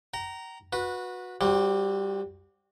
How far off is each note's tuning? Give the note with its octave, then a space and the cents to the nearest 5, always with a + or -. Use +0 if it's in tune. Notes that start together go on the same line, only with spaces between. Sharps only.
G5 -45 A#5 +0
F#4 -20 B4 -10
G3 +0 C4 +30 F#4 -20